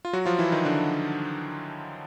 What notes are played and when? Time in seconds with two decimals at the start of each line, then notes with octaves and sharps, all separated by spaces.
0.05 F4
0.13 F#3 F#4
0.25 F3 F4
0.39 E3 E4
0.52 D#3 D#4
0.65 D3 D4